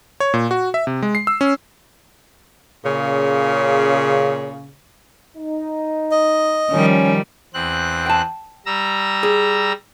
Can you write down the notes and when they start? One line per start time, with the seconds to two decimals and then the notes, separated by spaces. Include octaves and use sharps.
0.20 C#5
0.34 A#2
0.51 F#4
0.74 E5
0.87 C3
1.02 G#3
1.15 C7
1.27 E6
1.41 C#4
2.85 A#2 C#3
5.37 D#4
6.11 D#5
6.71 D#3 F3 G3 C#4
7.54 E2 C4 F#6
8.06 G5 A5
8.66 G3 A#5 E6
9.23 G#4